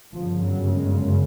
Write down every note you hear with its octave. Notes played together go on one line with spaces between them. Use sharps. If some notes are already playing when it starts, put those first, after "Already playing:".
G1 F#2 C#3 F3
F#3
G#3